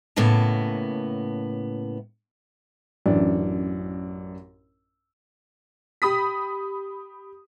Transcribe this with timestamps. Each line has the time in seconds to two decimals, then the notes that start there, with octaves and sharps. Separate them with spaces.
0.16 A2 C#3 A#3 B3 A5
3.06 A1 F#2 E3 D4
6.02 G4 B5 D#6 B6